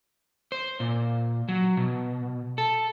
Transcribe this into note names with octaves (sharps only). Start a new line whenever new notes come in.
C5
A#2
F#3
B2
A4